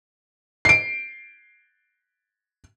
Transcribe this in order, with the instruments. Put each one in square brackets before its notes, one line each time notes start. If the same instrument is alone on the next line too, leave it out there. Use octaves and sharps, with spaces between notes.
[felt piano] C7 D7